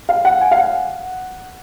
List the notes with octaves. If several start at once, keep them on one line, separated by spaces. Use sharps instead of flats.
F5
F#5
G#5
F5
F#5